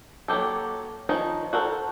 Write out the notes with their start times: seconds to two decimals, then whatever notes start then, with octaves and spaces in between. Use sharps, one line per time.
0.28 F#3 A#3 C4 G4 A4
1.09 D#3 F3 C#4 D#4
1.53 F#4 A4 A#4 C5